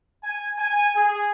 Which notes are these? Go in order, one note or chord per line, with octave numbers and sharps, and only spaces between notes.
G#5
G#5
G#4